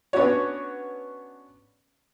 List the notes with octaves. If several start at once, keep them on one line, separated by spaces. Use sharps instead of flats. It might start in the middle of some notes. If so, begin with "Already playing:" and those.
B3 C#4 D4 F#4 C#5